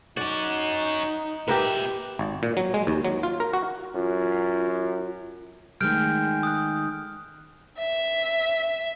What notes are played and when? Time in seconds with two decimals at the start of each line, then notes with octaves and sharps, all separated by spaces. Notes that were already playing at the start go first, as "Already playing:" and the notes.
0.17 C#4 D#4 F#4 D5
1.48 A#2 G4 A#4 B4 E5
2.19 G#1
2.43 A#2
2.57 F#3
2.74 G#3
2.87 D#2
3.05 F#3
3.23 F4
3.40 A#4
3.53 F#4
3.95 F#2 F4
5.81 D#3 G#3 A3 F6 G6 D7
6.43 D#6 F#6
7.78 E5